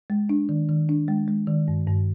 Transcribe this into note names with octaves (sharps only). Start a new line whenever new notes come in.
G#3
D4
D#3
D#3
D4
G#3
G#3
D#3
G2
G2